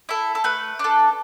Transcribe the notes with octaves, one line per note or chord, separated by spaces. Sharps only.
E4 A4
A4
A3 B4
D4 A4